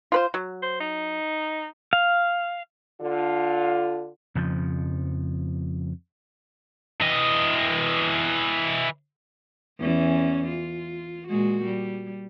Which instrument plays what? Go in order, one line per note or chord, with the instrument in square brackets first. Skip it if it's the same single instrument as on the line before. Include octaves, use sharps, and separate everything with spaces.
[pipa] F4 B4 C5
F#3
[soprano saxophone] C5
D#4
[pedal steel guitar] F5
[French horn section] D3 F4
[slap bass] F2 C#3 F3
[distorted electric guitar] E3 D#5
[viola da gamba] E2 E3 C#4
F4
A#2 G#3 F#4
G3